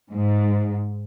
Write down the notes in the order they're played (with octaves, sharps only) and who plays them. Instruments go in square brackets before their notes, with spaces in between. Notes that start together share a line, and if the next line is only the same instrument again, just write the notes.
[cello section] G#2